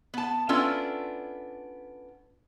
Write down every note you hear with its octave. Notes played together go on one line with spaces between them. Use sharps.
B3 A5
B3 C#4 D4 E4 F4 A4